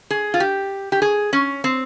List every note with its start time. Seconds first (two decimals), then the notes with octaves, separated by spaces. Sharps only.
0.11 G#4
0.34 F4
0.40 G4
0.92 G4
1.02 G#4
1.33 C#4
1.64 C4